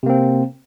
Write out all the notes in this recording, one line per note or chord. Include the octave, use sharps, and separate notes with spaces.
C3 A#3 C4